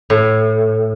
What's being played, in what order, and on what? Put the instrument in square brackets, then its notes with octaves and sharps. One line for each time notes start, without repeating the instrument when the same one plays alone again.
[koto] A2